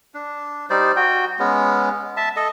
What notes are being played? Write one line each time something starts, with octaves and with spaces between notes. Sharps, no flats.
D4
G3 D#4 C5 D5
F#4 G5
G#3 B3 C#4
E5 A5
A4 D#5